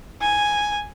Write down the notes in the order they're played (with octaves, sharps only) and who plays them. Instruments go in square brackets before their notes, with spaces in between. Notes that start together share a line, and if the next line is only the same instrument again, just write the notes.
[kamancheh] G#5